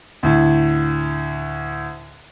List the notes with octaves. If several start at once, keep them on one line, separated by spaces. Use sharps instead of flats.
D2 A2